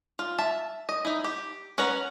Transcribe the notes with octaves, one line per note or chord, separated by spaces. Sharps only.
F4
E5 A5
D#5
D#4 E4
G4
C#4 B4 F#5 A#5